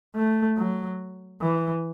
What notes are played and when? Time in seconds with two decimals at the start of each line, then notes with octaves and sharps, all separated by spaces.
0.16 A3
0.58 F#3
1.41 E3